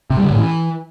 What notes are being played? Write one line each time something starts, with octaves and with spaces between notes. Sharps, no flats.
C3
G3
D3
A2
E3